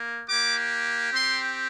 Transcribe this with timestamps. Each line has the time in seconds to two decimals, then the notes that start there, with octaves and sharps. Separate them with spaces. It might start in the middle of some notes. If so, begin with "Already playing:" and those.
Already playing: A#3
0.27 A#3 G4 D6
1.14 C4 G4 C6